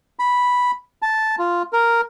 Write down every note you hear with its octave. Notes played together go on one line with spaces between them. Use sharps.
B5
A5
F4
A#4